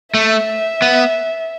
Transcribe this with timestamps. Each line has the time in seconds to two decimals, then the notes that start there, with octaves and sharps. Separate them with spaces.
0.14 A3 E5
0.82 B3